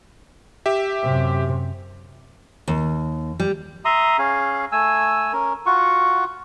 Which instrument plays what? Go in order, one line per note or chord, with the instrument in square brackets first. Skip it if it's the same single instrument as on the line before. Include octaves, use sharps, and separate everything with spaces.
[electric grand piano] G4 E5
[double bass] F#2 C3
[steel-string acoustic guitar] D#2
G3
[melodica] E5 A#5 C6 D#6
C#4 G#4 F5
A3 G#5 E6
C#4 A#4
F4 F#4 F#5 C#6